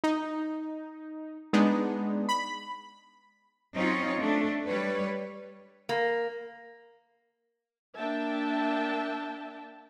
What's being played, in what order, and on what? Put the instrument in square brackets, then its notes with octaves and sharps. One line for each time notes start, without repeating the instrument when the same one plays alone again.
[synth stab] D#4
G#3 B3 D4 D#4
B5
[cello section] F#3 C4 C#4 D#4 F4 C#5
A3 D4
G3 B4 C#5
[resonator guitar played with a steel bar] A#3
[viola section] A#3 D4 E5 G5 A5